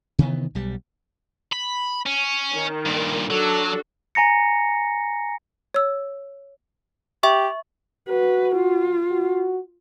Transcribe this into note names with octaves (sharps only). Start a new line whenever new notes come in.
C3 D#3 E3 B3
B1 G3
B5
C#4
D#3
G2 A#2
F#3 D4 F#4 A4
G#5 A#5 A#6 C#7
C#5 E6
G4 E5 C#6
F#4 B4
F4
F#4